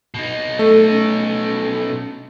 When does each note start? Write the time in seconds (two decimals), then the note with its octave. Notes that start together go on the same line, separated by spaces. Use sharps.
0.14 B2 D#4
0.59 A3 A4
0.91 C#4